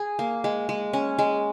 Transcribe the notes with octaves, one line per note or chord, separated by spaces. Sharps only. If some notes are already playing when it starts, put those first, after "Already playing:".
Already playing: G#4
A#3
G#3
G#3
C#4
G#3